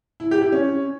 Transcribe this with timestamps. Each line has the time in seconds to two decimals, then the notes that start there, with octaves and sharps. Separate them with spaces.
0.20 E4
0.31 G4
0.41 E4
0.52 C#4